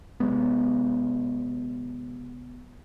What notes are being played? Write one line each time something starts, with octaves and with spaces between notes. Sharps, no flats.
C3 F#3 G#3 B3